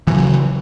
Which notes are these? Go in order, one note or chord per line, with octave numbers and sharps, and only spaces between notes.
C#3 E3 F#3